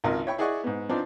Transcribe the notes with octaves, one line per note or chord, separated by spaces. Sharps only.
G#1 C#2 A#4 D#5
C#5 E5 G5 B5 C#6
E4 G#4 D5 D#5 F#5 C#6
G#2 B3
F3 B3 C4 D4 D#4 D5